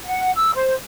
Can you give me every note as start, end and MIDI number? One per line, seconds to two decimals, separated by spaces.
0.06 0.32 78
0.36 0.51 88
0.54 0.74 72